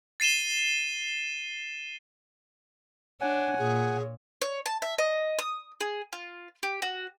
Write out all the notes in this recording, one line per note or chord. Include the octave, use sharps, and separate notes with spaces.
A6 C7 D#7 E7 G7
D4 C#5 F#5 G#5
A#2 G#4
C#5
A5
E5
D#5
D#6
G#4
F4
G4
F#4